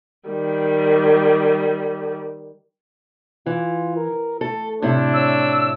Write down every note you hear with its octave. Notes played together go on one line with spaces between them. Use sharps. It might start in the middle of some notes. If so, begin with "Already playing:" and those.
D#3 G3
E3 F4
A#4
A3 A4
A2 C3 D4 E4
C#5 E6